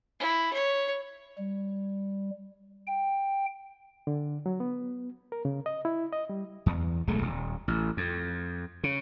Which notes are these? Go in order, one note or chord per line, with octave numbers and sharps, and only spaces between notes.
E4
C#5
G3
G5
D3
F#3
B3
A#4
C#3
D#5
E4
D#5
G3
E2
D1 B1 G#3 A3
D#1
A1
F2
C#3